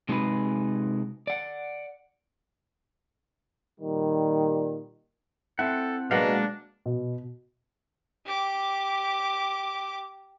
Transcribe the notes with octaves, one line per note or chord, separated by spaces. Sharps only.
C3 G#3 D#4 F#4 G#4 B4
D5 F#5
A#2 D#3 G3
C4 E4 A4 F#5
B2 F#3 G#3 A#3 D4 F5 F#5 A#5
B2
G4 D6